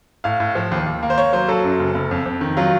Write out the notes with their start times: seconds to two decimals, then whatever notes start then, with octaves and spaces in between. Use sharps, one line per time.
0.24 A2 F5
0.40 A2
0.55 F3
0.71 D#2
0.86 D#2
1.03 A#3
1.10 C5
1.18 A#3 C#5
1.33 F#3 C5
1.48 F#3 A4
1.64 F#2
1.80 F#1
1.95 F#1
2.11 F2
2.26 F2
2.41 D#3
2.57 F#3 F4